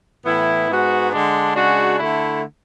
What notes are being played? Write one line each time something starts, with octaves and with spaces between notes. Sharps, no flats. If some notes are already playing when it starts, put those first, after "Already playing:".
A2 E3 B3 E4
G#2 G#3 B3 F#4
D3 G#3 D4
C#3 G#3 D4 F#4
D3 A3 E4